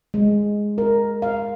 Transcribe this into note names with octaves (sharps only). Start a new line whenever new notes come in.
G#3
A#4
F5